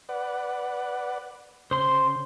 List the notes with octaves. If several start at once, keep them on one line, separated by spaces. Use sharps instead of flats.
B4 D5 F#5
C#3 C5 C6